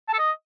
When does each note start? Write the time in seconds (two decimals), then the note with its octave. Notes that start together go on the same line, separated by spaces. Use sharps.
0.08 A5
0.14 A4
0.19 D#5